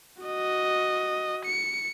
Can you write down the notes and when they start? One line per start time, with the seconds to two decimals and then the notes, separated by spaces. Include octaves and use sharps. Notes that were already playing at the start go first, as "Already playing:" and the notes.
0.22 F#4 D#5
1.45 C#7